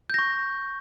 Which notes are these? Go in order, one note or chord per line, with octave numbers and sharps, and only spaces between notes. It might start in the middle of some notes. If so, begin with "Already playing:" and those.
C#6 G6 A#6